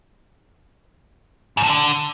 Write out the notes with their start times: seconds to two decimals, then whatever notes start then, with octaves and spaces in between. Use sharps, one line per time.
1.57 G#2
1.63 A2
1.69 D3